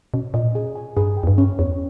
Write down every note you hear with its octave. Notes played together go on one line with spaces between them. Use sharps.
B2 C#4
A#2 D#5
G#4
G#5
G2 G#4
G5
E2
G2
C#4
E2 C#5